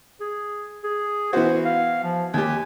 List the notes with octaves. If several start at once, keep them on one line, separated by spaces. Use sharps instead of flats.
G#4
G#4
E3 B3 F#4 C5
F5
F3
D#2 G4 G#5